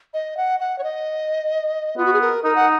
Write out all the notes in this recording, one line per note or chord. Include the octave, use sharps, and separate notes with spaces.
D#5
F#5
F#5
C#5
D#5
B3 F4
F#4
G#4
A#4
D#4 A#4
F#5